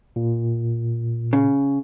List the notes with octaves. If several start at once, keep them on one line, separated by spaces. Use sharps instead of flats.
A#2
C#3